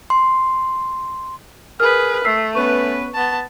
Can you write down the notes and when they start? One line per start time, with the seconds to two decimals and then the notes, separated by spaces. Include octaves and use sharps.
0.10 C6
1.80 G#4 A#4 B4 F6
2.25 A3 E6 B6 C7
2.55 B3 C#4 B4 C#6
3.14 B3 A5